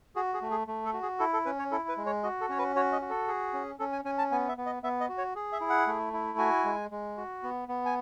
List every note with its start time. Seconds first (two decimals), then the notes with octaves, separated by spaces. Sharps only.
0.16 F#4 G#4
0.34 G#4
0.42 A3
0.51 G#4
0.67 A3
0.85 A4
0.93 F#4
1.03 G#4
1.19 E4 A4
1.33 A4
1.45 C#4 B4
1.59 C#5
1.71 E4 A4
1.89 B4
1.97 G#3
2.06 C#5
2.23 F#4 D#5
2.41 A4
2.49 C#4 C#5
2.59 B4
2.76 F#4 C#5
2.92 D#5
3.01 F#4
3.10 A4
3.28 G#4
3.53 C#4
3.80 C#4 A4
3.92 G#5
4.05 C#4 G#5
4.18 A5
4.31 B3 G#5
4.48 E5
4.58 B3
4.66 D#5
4.83 B3 E5
5.01 D#5
5.09 F#4
5.18 C#5
5.36 G#4
5.52 E5
5.61 E4
5.70 F#5
5.87 A3
6.13 E4
6.38 F#4 G#5
6.65 G#3
6.91 G#3
7.17 F#4
7.43 B3
7.68 B3
7.85 G#5